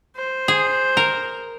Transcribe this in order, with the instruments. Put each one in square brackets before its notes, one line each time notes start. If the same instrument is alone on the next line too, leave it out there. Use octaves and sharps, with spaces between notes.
[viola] C5
[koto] G#4
A#4